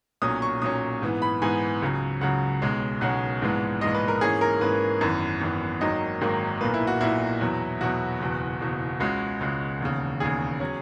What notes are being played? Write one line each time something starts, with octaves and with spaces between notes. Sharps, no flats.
B1 A#2 F#3 C#4 D#6
C#6
B1 A#2 F#3 C#4 D#6
G#2 E3 B3
B5
G#2 E3 B3 G#5
C#2 C#3 F#3
C#2 C#3 F#3 F#5
B1 B2 G#3 C#4
B1 B2 G#3 C#4 F#5
A#1 G#2 E3 G#3 B3
A#1 G#2 E3 G#3 B3 D#5
B4
A#4
G#2 E3 A#3 C#4 G#4
A#4
G#2 E3 A#3 C#4 B4
G#1 F#2 E3 B3
G#1 F#2 E3 B3
G#1 G#2 D#3 F#3 A#3 D#5
G#1 G#2 D#3 F#3 A#3
B1 A#2 A#3 B4
E4
F#4
B1 A#2 A#3 E4
E2 B2 F#3
E2 B2 F#3 F#4
F#1 E2 B2
F#1 E2 B2
C#2 C#3 G#3 F#4
C#2 C#3 G#3
E1 D#2 C#3
E1 D#2 C#3 G#4
F#3 C#4